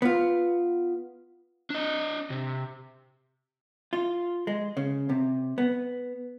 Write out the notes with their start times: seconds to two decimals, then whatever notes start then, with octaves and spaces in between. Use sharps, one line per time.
0.02 B3 F4
1.70 D4 D#5
2.30 C3
3.93 F4
4.47 G#3
4.77 C#3
5.10 C3
5.58 B3